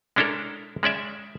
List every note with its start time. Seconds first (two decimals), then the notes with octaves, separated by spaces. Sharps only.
0.16 G#3 C#4 D4 E4 A4 A#4
0.83 G#3 C#4 D5 E5